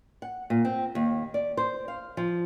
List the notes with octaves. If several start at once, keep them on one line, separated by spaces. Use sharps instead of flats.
F#5
A#2
C4
D#2
D5
C5
F5
F3